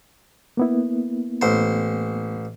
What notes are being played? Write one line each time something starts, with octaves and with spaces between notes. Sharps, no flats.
A#3 B3 E4
A1 C5